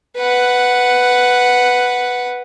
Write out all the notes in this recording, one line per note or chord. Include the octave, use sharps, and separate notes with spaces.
B4 F#5